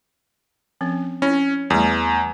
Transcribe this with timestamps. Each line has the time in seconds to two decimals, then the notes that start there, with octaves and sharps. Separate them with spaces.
0.81 F3 C4 C#4
1.22 C#4 E4
1.70 E2 G3 A3